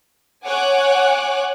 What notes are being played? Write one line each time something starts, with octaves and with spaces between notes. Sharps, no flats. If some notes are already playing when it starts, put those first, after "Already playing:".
C#5 F#5 G#5 D6 F#6